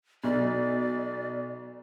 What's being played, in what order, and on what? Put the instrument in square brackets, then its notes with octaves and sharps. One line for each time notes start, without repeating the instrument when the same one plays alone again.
[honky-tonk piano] B1 [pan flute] D5